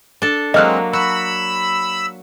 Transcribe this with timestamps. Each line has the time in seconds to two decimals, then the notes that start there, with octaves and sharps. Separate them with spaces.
0.22 D4 A4
0.54 F#3 G#3 A#3 C4 D#5 F6 F#6
0.93 F#4 B5 E6